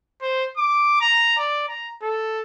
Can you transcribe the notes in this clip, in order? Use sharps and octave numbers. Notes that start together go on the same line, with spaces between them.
C5
D6
A#5
D5
A#5
A4